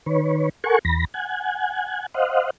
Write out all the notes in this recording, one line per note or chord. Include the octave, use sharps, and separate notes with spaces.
D#3 B4 C#5
A4 A#4 F#5 G#5 C#6
E2 B5 A#6
F#5 G#5
C5 D#5 F5 F#5